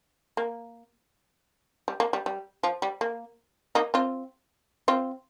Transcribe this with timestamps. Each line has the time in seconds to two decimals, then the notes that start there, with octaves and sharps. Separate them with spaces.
0.37 A#3
1.88 G3
2.00 A#3
2.13 G3
2.26 G3
2.63 F3
2.82 G3
3.01 A#3
3.75 A#3 D#4
3.94 C4 F4
4.88 C4 F4